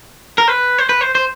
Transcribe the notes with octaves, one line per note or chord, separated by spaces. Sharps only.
A#4
B4
C5
B4
C5
C5